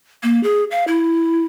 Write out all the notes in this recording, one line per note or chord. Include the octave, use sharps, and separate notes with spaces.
A#3
G#4
F5
E4